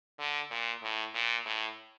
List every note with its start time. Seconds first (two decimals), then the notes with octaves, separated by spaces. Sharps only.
0.18 D3
0.51 A#2
0.82 A2
1.14 A#2
1.45 A2